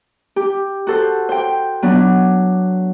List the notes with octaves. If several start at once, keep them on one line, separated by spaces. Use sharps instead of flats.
G4
F#4 A4 C5
C5 G5
F#3 B3 D4